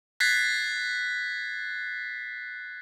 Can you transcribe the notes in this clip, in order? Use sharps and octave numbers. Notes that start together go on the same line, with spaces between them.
F#6 G#6 A6 B6 C7